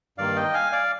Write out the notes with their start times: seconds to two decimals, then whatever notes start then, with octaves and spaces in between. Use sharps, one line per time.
0.18 G2 D#3 A#3 D5 F5
0.36 D#5 G5
0.54 F5 G#5
0.72 D5 F5